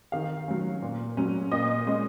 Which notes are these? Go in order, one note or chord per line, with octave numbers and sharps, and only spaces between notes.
D#3 F5
F#3 C#4
A#2
F#3 C#4
A#2 D#5
G#3 C#4